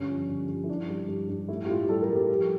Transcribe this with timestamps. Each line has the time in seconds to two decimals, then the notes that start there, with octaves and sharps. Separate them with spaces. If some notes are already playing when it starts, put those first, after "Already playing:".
Already playing: G1 G2 C#4
0.09 F3
0.29 G1
0.48 F3
0.64 E4
0.69 G2 D4
0.89 G3
1.08 G2
1.29 G2
1.48 A2 E4
1.65 G4
1.69 A2 F4
1.89 G3 A4
2.02 A#4
2.09 G3
2.16 G4
2.29 F3